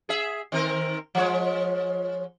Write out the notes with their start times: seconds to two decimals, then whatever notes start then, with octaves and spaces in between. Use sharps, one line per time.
0.09 G#4 E5
0.52 D#3 C4 A#4
1.15 F3 G#3 C#5